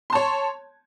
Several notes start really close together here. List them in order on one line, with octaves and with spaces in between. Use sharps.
C6 A5 C#5